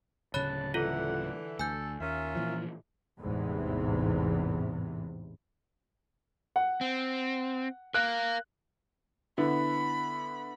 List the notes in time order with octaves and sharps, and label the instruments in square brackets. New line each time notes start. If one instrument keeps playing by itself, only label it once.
[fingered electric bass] D1 C#3 [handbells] C#5 B5 F#6 [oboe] A5
[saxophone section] D3 E3 [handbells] F4 A4 [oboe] F#5
[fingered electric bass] D2 [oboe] A4 [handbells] G#5 G6
[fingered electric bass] D#2 [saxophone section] C#4 A#4 E5 [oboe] F4
[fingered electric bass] A#2 E3 F3
[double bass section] A1 E2 G#2 C3 E3
[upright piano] F#5
[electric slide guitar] C4
[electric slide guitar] A#4 F5 [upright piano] F#6
[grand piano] D3 B3 E4 [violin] B5